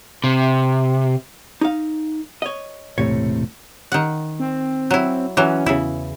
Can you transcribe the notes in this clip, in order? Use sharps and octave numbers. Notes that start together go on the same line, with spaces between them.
C3
D#4 F5
C#5 D#5
E1 A2 C3 C#5
D#3 F#5
C4
F#3 E4
E3 F#3 C#4
E2 C#3 E4